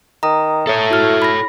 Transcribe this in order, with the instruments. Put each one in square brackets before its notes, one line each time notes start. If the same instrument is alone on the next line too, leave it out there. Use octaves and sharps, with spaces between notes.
[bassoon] D#3 [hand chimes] A#5 D#6
[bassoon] A3 [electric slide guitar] A4 C#5
[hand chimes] E4 F#4 F6
B5 A#6